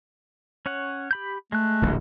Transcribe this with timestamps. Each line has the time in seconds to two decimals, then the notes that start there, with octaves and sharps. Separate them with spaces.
0.66 C#4 C#5 F#5
1.11 G4 B5 G6
1.52 G#3 A3 F#6
1.82 D1 A#1